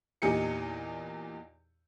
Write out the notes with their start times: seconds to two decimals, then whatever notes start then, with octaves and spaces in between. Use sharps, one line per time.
0.22 E2 A#2 D#4 G4 G#5 C#7